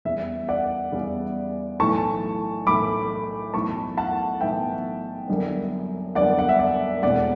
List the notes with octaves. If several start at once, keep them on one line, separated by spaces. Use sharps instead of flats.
E2 C#3 G3 B3 E5
D5 F#5
E2 C#3 G3 B3
B1 A2 E3 A3 A5 C#6
B1 A2 E3 A3 B5 D6
B1 A2 E3 B3 A5 C#6
F#5 A5
B1 A2 E3 B3 E5 G5
F#1 F#2 D3 G3 B3
F#1 F#2 D3 G3 B3 D5 F#5
F#5
E5
D5
E1 E2 B2 A3 D5 F#5